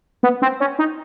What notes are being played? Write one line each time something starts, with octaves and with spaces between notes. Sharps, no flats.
B3
C4
C#4
D#4